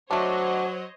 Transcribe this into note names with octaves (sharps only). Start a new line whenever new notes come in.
F#3 A3 D4 F#4 C5 C#5 D#5